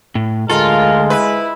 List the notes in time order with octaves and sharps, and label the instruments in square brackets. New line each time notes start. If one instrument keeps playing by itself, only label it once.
[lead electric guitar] A2
[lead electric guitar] D2 A4 [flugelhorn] G#3 [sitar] F4 [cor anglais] A#4
[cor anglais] E4 [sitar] B4